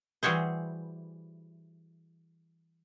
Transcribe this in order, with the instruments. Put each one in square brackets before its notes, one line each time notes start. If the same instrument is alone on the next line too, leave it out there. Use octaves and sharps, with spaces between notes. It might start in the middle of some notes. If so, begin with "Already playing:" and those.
[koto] E3 G3 F#4 G#4 C5